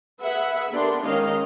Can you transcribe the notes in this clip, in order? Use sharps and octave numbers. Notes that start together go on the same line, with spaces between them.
G#4 B4 E5 F#5
D3 B3 D4 G4 A#4 C6
D#3 G#3 C#4 D#4 D#5 F5